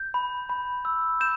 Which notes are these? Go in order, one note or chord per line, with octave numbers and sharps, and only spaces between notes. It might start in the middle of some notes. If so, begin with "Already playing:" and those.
Already playing: G6
B5
B5
E6
G6 E7